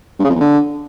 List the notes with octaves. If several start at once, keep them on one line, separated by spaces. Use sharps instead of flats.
G2
C#3
F2
E2
D3